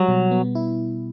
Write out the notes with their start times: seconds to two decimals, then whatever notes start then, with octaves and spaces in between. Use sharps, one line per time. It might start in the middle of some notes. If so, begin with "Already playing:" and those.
Already playing: F#3 G3
0.08 B2
0.31 B3
0.55 E4